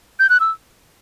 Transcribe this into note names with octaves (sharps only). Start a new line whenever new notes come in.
G6
F#6
E6